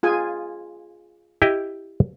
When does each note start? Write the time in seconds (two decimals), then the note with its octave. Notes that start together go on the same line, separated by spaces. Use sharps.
0.03 F4 G#4 G#5
1.42 E4 G4 D#5